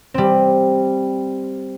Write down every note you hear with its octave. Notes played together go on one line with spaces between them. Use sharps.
G3 C4